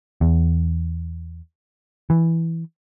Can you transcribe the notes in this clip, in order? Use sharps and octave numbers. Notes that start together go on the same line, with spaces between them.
E2
E3